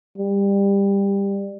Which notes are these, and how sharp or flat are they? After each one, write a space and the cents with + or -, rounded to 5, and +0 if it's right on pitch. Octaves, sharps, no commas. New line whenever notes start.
G3 +20